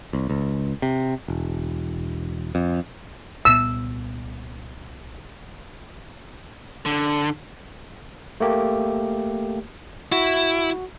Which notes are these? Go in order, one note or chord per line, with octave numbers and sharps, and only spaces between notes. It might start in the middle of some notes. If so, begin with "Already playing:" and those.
C2
C#2
C3
E1
F2
C2 A#2 B3 E6
D3
A3 A#3 G4
E4 F#4